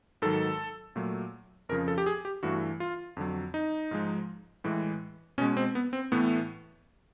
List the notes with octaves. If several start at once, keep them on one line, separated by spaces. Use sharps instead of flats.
G#2 D#3 F#3 A4
A#2 F#3 A3
F2 C#3 F3 A#4
A4
G4
G#4
G4
G2 E3 A3 F#4
F4
F2 D3 F#3
D#4
G#2 F3 G#3
A2 E3 G#3
B2 G#3 C#4
C4
B3
C4
A2 E3 A3 B3